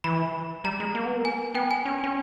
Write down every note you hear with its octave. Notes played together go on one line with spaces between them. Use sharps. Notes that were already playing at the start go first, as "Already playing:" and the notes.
E3 B5
G3 A#5
G#3
A#3
B3
A#3
G#5
B3 G5
G#5
C#4
C#4